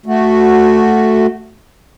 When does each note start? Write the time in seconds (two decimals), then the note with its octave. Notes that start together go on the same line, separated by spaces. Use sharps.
0.06 A3 F#4